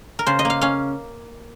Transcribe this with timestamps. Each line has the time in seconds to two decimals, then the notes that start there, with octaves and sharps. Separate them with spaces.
0.19 A#4
0.26 C#3 C5
0.39 D#5
0.45 A#3 F5
0.61 C#4 F5